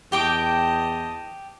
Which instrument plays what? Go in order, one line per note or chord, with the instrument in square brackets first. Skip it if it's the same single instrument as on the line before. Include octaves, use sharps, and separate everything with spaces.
[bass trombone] E2 [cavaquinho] G4 G5 D6 [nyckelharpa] D#5 A5